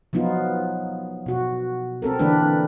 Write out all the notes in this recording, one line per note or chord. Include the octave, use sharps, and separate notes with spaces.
F3 F#3 B3 D#4 F4
B2 F#4
C4 A4 A#4
D3 E3 A#3 D4 A4 B4